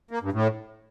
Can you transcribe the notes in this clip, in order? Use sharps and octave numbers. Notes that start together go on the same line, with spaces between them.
A#3
G2
A2